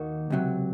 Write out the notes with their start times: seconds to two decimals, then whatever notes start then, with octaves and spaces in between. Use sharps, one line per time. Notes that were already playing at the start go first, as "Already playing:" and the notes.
Already playing: D#2 D#3 A#3 D#4 F#4
0.30 C#2 C3 F#3